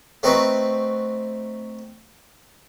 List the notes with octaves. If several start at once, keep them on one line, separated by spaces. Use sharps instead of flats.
A3 C4 D#4 F#4 B4